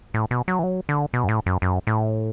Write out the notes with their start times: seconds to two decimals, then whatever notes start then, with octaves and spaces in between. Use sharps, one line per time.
0.14 A2
0.31 B2
0.48 F#3
0.59 E3
0.63 F#3
0.89 D3
1.13 B2
1.24 F#2
1.29 A2
1.46 F#2
1.62 F#2
1.87 A2